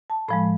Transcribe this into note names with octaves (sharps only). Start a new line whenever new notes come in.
A5
A2 F3 G#3 B5